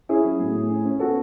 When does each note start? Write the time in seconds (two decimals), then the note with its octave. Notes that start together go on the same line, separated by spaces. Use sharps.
0.09 C#4 E4 G#4
0.24 F#3
0.40 A2
0.55 A2
0.70 C#4
0.85 C#4
1.00 B3 F#4 A4